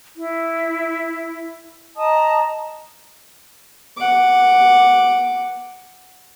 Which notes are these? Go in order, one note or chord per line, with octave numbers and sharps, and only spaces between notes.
E4
D#5 A5 A#5 D#6
F#5 D6